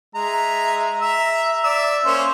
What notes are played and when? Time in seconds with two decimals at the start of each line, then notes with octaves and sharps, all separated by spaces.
0.15 G#3 E5 A#5
1.01 E5 A#5 E6
1.64 D5 E5 E6
2.05 A#3 C#4 C5